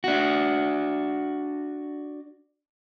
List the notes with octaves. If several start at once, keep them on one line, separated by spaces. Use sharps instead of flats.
D4 F#4